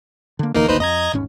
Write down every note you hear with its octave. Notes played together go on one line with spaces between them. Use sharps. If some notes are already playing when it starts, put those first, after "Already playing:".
D3 A#3
D1 D2 E3 A#3 D#4 A#4
G#1 D2 A#3 D#4 B4 C5
F2 D#5 A#5 G#6
D#1 G#2 C#4